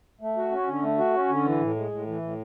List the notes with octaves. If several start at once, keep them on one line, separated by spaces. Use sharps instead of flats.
A3
F#4
C#4
D3
A3
F#4
C#4
D3
E3
A2
G#3
A2
E3
A2